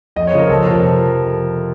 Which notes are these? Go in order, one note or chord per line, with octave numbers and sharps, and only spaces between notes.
F2 D#5
C#5
C#3 F3
A#4
F2 A4
C3 F3 A#4